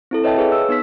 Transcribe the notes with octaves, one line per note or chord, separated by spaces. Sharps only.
C4 E4 A4
B4 C#5 D#5 E5 G5 A5
G#4 B4 C#5 F5
E6
B3 D#4 E6 B6